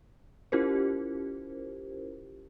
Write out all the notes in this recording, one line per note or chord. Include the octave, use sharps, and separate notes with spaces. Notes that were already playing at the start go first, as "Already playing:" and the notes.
C#4 E4 F4 G4 A#4 C5